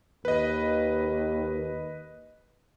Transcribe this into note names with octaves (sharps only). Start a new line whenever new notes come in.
D#2 B4 D#5